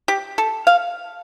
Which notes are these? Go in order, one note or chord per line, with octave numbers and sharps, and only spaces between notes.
G4
A4
F5